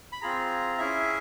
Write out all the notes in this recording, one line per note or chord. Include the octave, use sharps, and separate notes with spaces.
B5
C4 F4 G#4 A#5
C#4 E4 G#4 E5